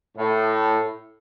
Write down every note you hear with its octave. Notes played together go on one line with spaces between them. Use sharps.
A2